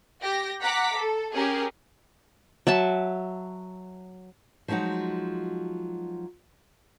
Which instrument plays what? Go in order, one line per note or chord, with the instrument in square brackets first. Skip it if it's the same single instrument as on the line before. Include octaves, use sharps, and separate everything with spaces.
[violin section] G4 G5 A#6
F#5 A#5 D6 B6
A4
C#4 G4 G#4 A#4
[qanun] F#3 E5 A5
[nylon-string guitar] F3 F#3 G#3 D#4 F#4